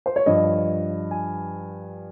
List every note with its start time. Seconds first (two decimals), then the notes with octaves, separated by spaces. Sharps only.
0.06 C5
0.16 C#5
0.26 G2 F3 D#5
1.11 G#5